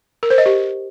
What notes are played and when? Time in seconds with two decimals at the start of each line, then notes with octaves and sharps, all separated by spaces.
0.23 A#4
0.30 C5
0.38 D#5
0.46 G4